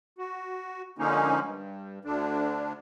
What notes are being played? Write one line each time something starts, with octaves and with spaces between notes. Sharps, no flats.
F#4
D3 F3 G#3 A#3 C#4 D#4
G2
D2 D3 D4